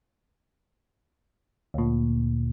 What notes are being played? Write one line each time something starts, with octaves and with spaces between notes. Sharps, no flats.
D2 A#2